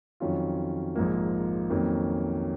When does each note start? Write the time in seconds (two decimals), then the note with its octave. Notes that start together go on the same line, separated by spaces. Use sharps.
0.20 F2 D#3 F#3 C#4 F4
0.95 A#1 G#2 F3 A#3
1.70 F2 D#3 F#3 A#3 C#4